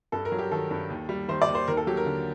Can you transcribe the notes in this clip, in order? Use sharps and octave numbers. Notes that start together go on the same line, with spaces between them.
G2 A4
A#4
F#3
G4
D#3 A4
G2
D#2
G3
D#3 C5
D5
D#2
C5
D#2 A#4
A4
F#3 G4
A#4
D3